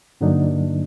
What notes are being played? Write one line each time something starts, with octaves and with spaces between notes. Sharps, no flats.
G2 D3 F#3 A#3 D4 D#4